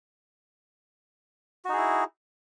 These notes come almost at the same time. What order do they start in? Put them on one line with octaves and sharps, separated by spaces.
F#4 D#4 G#4 E4